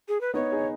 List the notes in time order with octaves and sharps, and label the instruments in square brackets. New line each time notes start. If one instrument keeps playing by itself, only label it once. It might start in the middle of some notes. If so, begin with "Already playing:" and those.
[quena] G#4
B4
[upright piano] B3 D#4 [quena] C#5
[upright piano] D#4 G#4